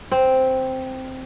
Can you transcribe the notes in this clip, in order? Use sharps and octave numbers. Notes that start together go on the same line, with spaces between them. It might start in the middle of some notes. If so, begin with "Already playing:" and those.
C4